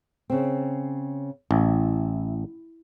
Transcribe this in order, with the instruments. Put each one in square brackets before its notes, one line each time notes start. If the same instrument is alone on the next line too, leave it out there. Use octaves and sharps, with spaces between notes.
[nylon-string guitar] C#3 C4
[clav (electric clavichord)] A1 [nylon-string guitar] E4